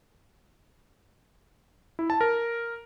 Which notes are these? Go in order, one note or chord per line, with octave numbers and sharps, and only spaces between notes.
E4
A5
A#4